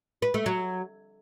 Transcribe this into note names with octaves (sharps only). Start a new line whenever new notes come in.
B4
A3
F#3